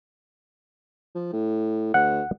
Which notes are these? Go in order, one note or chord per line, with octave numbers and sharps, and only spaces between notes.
F3
A2
D2 F#5